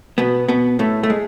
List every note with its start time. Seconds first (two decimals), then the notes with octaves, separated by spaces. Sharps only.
0.18 B2 B3
0.49 B2 B3
0.79 A2 A3
1.03 A3
1.10 G#3